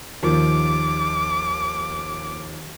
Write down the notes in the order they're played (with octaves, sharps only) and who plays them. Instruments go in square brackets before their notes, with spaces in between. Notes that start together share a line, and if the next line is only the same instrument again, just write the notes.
[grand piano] D#2 D#3 F3 [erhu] D6